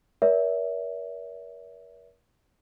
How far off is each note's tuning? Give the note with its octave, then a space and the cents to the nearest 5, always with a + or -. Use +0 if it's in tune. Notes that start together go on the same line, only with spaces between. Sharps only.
A#4 +40 C#5 +40 E5 -20